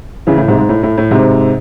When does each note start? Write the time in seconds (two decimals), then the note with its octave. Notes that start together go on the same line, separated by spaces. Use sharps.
0.27 C#3 E3
0.37 A2
0.48 G#2 C3
0.58 G#2
0.69 A2
0.83 A2
0.98 A2
1.11 G#2 C3